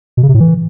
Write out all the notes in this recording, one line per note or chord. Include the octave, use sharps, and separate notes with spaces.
B2
C#3
C3
A2
E3